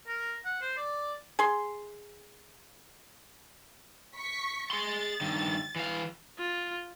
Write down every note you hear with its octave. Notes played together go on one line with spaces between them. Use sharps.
A#4
F#5
C5
D5
G#4 C6
C#6 B6
G#4 C6 A6
G2 D#3
E3 F5
F4